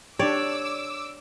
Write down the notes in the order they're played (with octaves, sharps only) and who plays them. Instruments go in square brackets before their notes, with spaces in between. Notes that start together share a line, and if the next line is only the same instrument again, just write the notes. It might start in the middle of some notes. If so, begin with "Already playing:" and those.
[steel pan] D4 G4 [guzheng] C#5 [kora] D5 [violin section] D6 E6